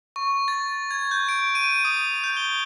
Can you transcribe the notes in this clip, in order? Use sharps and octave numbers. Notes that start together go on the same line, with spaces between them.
C#6
A6
G#6
G6
D7
D#7
D#6
G6
G7